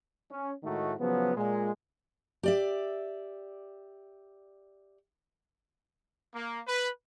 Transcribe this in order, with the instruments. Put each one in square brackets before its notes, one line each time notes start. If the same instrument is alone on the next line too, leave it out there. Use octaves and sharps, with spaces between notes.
[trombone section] C#4
A2 D#3 G#3 A3 D#4 F#4
C#3 F3 F#3 B3
A#2 G#3
[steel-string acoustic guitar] G4 D5 E5
[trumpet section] A#3
B4